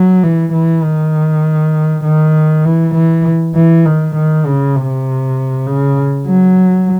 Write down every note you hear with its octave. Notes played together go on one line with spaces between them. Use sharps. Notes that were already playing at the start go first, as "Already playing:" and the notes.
Already playing: F#3
E3
E3
D#3
D#3
E3
E3
E3
D#3
D#3
C#3
C3
C#3
F#3